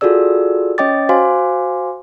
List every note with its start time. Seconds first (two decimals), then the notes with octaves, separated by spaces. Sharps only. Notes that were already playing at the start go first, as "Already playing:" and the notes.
0.01 F4 F#4 G#4 A4 D5 E6
0.78 C#4 C#5 D#5 G5 D6 A6
1.09 F#4 C5 F5 G#5 C6 D6